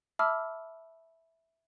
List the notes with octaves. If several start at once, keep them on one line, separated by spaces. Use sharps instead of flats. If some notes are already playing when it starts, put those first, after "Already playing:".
E5 A5 B5 D6 E6 F6